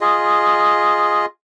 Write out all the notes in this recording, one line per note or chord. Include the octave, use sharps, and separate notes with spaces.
F4 G#4 D#5